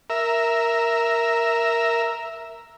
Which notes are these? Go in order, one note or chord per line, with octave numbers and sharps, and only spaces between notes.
A#4 E5